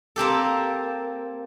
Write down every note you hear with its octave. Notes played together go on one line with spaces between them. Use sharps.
A#3 C4 G4 A4